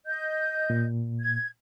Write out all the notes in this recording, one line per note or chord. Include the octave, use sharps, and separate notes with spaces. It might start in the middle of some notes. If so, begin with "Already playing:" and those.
D#5 G6
A#2
G#6